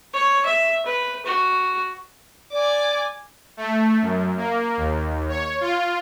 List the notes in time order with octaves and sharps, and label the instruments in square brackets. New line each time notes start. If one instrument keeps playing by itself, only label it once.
[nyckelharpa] C#5
E5
B4
F#4
[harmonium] D5 [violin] G#5 D6
[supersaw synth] A3
F#2
A#3
D#2
C#5
F4